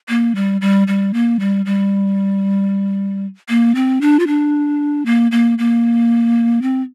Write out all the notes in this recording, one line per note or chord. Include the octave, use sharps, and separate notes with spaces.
A#3
G3
G3
G3
A#3
G3
G3
A#3
C4
D4
F4
D4
A#3
A#3
A#3
C4